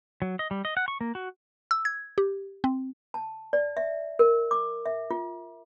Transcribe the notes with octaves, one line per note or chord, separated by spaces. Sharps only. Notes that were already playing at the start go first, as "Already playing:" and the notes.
F#3
D#5
G3
D#5
F#5
C#6
A#3
F#4
E6
G#6
G4
C4
A5
D5
E5
A#4
D6
E5
F4